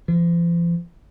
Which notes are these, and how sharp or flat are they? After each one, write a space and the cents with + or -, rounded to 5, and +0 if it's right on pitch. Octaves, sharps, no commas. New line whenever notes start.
F3 -40